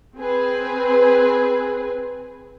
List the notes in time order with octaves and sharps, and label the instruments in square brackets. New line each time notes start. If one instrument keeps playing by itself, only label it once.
[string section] C4 G#4 B4